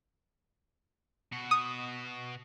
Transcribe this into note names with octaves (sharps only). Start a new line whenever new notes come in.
B2 F#4
D#6